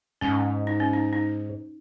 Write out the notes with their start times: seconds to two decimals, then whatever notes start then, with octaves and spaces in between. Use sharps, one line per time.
0.21 G#2 C#4
0.67 D#4
0.80 C#4
0.93 D#4
1.13 D#4